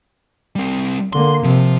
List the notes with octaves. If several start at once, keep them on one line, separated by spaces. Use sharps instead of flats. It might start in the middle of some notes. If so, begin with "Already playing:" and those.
G3 C4
D3 A#3 C6
C3 F3